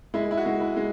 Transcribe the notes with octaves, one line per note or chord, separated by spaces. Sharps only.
G#3 E4
E4
F#4
G#3
E4
G#3